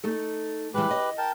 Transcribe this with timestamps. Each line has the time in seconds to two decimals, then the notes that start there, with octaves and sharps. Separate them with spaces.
0.04 A3 D#4 A4
0.74 E3 G3 G#3 G4 B4
0.91 D#5
1.18 A#4 G5 A5